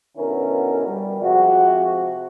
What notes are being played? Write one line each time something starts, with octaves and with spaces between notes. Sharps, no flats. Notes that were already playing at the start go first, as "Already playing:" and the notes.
B1 D3 B3 C#4 E4 A#4
G3
C3 F3 G#3 F#4